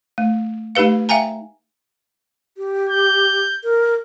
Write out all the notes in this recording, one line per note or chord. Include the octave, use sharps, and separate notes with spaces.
A3
A3 D#4 G4 B4 F5
E5 F5 G5 G#5 A#5
G4
G6
A#4